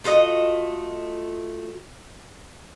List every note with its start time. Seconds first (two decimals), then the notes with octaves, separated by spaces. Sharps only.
0.04 A3 F4 F#4 D#5